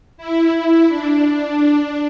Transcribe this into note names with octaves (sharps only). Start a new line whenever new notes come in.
E4
D4